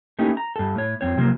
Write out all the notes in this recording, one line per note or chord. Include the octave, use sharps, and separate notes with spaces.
A3 A#3 C#4 D#4 E4 G4
A#5
G2 A4
A2 C#5
F2 C4 C#5
C3 F3 F#3 A#3